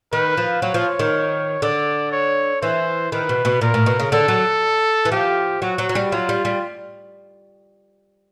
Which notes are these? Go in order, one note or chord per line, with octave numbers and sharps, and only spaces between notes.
D#3 B4
F3
F#3 C#5
F3
D#3
D3 D5
C#5
E3 C5
D#3 B4
B2
B2
A#2 A#4
A2
B2
C#3
D3 A4
F#3
E3
F3 G4
F#3 F#4
F#3
F#3
G3
F#3 F4
G3
G3